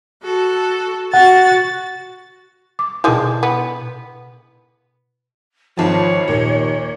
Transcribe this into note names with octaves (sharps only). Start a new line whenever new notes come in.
F#4 A4
F#4 F#5 A6
D6
B2 D#3 G#3 D4 E4
B3
G#1 D#3 F3 C#5 A5
D#2 A#2